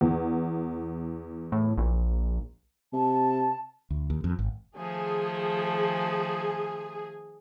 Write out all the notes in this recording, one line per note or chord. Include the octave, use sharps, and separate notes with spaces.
E2
A2
A#1
C3 A5
D2
D#2
F2
G#1
D#3 F3 A3 G#4